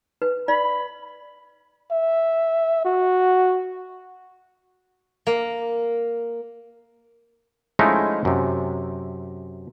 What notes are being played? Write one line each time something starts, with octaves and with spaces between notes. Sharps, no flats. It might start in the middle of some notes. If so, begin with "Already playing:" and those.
B4
D5 B5
E5
F#4
A#3
F3 G#3 A3 C#4 D#4 E4
F#2 C3